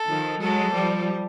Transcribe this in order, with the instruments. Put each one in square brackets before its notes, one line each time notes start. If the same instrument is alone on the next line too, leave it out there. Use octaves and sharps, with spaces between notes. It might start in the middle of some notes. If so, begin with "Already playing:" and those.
Already playing: [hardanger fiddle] A4
[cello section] D#3 F3
[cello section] F#3 G#3 [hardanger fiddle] A4
[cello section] F3 G3